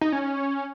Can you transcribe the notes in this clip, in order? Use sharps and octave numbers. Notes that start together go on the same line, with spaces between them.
D#4
C#4